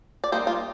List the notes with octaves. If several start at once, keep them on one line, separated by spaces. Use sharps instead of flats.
D5
G3 A#3 D#4 C5
F4